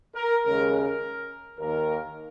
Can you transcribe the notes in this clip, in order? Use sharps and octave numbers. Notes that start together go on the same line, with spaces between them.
A#4
D#2 C#3 G#3 A#4
A#4
D#2 D#3 A#3 A#4